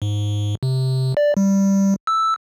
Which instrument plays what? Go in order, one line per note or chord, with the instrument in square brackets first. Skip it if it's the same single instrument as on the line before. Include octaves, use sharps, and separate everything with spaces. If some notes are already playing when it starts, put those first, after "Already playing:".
[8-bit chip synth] G#2
C3
D5
G3
E6